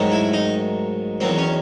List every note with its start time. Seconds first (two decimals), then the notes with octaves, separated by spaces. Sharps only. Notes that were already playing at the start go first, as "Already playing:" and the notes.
Already playing: G#2 D#3 F#3 A3
0.12 E4
0.33 D#4
1.20 E2 D#3 F#3 C4
1.38 C#4